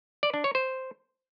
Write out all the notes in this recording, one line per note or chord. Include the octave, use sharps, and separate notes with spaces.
D5
D4
C#5
C5